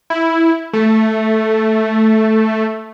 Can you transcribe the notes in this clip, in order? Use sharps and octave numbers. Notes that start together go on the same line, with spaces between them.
E4
A3